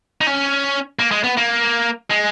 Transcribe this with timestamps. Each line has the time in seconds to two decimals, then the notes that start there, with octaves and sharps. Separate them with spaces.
0.21 D#4
0.27 C#4
0.99 A#3
1.11 G#3
1.24 B3
1.37 A#3
2.10 G#3